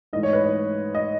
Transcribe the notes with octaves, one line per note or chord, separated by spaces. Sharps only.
G#2 E3 A3 D#5
C#5
B4
C#5
D#5